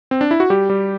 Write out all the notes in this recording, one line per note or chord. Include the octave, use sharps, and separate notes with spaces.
C4
D4
E4
F#4
G3 G4
G3